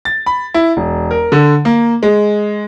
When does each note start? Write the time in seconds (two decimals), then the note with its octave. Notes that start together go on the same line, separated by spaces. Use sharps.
0.05 A6
0.26 B5
0.54 E4
0.77 E1
1.11 A#4
1.32 D3
1.65 A#3
2.03 G#3